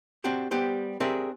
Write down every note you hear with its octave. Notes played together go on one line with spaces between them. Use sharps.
C4 D4 F#4 G4 C5
G3 B3 G4 C5
C4 D4 G4 G#4 A#4 E5